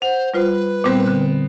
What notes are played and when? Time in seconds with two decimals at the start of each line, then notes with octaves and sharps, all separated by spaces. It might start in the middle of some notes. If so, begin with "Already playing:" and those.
0.02 C5 F#5 F7
0.34 G3 F4 B4 C5
0.84 A#2 G3 B3 C4
1.08 D3